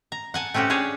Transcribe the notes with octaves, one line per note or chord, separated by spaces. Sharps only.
A#5
F#5 G#5 A5
A3 C4 C#4 F#4 G4
C#4 D4 G#4 C#5 D5